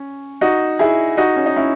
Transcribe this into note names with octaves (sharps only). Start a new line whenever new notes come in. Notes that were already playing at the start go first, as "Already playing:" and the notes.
Already playing: C#4
D#4 F#4
E4 G#4
D#4 F#4
C#4
D#4
C#4 E4